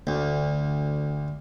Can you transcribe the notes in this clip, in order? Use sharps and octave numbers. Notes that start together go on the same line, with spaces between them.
D2